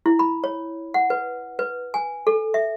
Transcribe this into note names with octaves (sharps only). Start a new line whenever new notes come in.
E4
B5
C#5
F#5
B4
B4
G#5
A4
E5